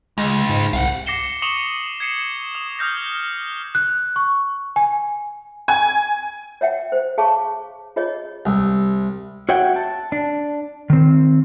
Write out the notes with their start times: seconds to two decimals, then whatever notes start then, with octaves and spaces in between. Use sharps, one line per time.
0.18 C#2 G#3
0.49 G#2
0.73 C2 F5 F#5
1.06 D6 A#6 C7 C#7 E7 G7
1.42 C#6 D#6 C#7 E7 F#7 G7
2.00 G#6 C7 C#7 E7
2.55 D#6
2.79 D#6 F6 G6 A#6
3.75 F#6
4.16 C#6
4.76 G#5
5.68 G#5
6.61 C#5 E5 F#5 G5
6.92 C5
7.18 G#4 C#5 F5 A5 C#6 D6
7.96 F4 G#4 C#5 D#5
8.46 C2
9.49 F#4 C#5 E5 F#5 G5
9.76 A5
10.12 D4
10.90 D#3 C4